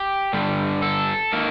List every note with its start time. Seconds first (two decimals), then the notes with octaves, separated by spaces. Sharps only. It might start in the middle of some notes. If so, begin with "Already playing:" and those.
Already playing: G4
0.33 G2 D3 G3
0.82 A4
1.33 D#3 A#3